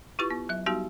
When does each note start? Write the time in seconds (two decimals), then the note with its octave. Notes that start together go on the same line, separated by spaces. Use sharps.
0.19 E4 F4 G4 B4 C#6
0.31 B3
0.49 F#3 E5
0.66 G3 B3 D#4 F#4 G4